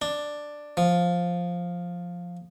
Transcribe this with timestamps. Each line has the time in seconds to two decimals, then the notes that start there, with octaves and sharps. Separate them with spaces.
0.02 D4
0.77 F3